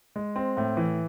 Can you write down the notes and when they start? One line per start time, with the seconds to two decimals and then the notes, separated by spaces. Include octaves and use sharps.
0.16 G#3
0.36 C4
0.57 A2
0.77 E3